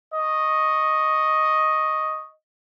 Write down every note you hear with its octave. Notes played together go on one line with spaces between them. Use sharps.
D#5 C#6